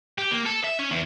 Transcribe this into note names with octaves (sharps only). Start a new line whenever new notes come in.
G4
A#3
A4
E5
C#4
E2